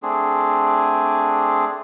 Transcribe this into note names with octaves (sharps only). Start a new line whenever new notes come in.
A3 C4 D4 G#4